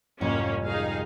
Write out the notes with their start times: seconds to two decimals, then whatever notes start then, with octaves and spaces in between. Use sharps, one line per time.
0.21 C2 F2 G#2 A#3 C#4
0.66 D#4 G#4 F5